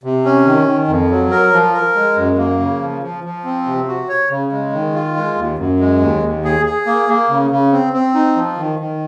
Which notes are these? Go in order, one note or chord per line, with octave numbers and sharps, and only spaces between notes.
C3
C#4
D#3
D#3
F2
F#3
A#4
F3
A#4
G#3
F#2
A#3
C#3
F3
F3
F3
C4
C3
F#4
C#5
C#3
G#3
D#3
F4
G#3
D#2
F#2
G#3
D#2
D#2
G#4
G#4
A#3
A#3
C#3
C#3
C4
C4
D#4
F3
D#3
D#3